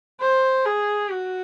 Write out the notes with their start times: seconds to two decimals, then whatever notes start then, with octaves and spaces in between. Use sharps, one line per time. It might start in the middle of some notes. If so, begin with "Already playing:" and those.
0.20 C5
0.65 G#4
1.11 F#4